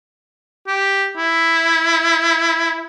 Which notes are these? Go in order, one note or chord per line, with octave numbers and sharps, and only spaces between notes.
G4
E4